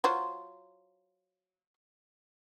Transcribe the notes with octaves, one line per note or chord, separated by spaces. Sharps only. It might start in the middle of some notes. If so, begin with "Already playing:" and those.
F#3 F4 C5